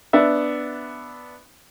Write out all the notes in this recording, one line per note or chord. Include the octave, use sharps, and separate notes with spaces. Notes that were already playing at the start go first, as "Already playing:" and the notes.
B3 D4 E5